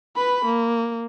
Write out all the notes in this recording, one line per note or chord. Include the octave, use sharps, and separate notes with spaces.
B4 B5
A#3